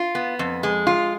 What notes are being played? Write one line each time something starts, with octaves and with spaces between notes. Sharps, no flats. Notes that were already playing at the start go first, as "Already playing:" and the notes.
Already playing: F4
B3
F2
G#3
F4